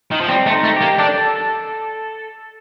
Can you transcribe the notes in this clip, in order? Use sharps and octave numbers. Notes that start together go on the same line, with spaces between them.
D#3
F3
G3 C4
A3
D#4
A3
A#3 G4
D4 A4